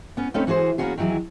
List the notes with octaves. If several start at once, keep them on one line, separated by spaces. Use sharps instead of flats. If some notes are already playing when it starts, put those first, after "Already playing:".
B3 C#4
A3 C4 C#4 D#4 A4 B4
E3 F#4 G#4 B4 C5
A#3 B3 C#4 F4 F#4 G#4
D#3 E3 F#3 E4 G#4